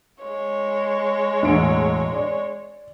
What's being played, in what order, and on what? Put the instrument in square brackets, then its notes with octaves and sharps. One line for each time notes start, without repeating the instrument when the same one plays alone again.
[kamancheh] G#3 C#5
[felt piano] E1 A2 D7
D5